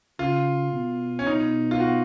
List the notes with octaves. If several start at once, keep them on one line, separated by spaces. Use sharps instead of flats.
C#3 F4
B2
C#4
B2 D#4
F4
F#4